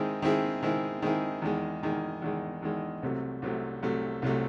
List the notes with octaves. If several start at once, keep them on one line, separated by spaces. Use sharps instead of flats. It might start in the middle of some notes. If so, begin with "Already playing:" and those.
Already playing: D#3 G#3 C4 E4 G#4
D#3 G#3 C4 E4 G#4
D#3 G#3 C4 E4 G#4
D#3 G#3 C4 E4 G#4
E2 D#3 G#3
E2 D#3 G#3
E2 D#3 G#3
E2 D#3 G#3
C2 C3 F#3 A3
C2 C3 F#3 A3
C2 C3 F#3 A3
C2 C3 F#3 A3